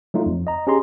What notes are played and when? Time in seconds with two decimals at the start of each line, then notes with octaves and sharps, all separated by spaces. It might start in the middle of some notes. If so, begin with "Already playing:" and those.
0.14 F#3 A3 D#4 F4
0.26 F2
0.47 D#5 A#5
0.67 C#4 G4 G#4 A#5 C6